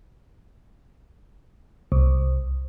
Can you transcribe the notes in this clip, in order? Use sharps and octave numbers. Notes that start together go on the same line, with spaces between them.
C2